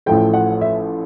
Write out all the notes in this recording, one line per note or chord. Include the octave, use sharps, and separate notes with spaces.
A1 A2 F3 A3 G5
F#5
E5